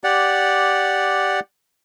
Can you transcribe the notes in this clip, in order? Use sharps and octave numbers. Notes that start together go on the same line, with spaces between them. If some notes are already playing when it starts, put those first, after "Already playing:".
G4 D5 F#5